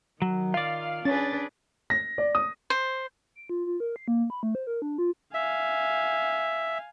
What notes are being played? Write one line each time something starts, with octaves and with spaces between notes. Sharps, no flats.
D#3 F#3
F4 D5 F5
C#4 D4 G#4 B4 A6
A#6
D5
D#6
C5
D7
F4
F4
A#4
C7
A#3
B5
A3
C5
A#4
D4
F4
E5 F5 G#5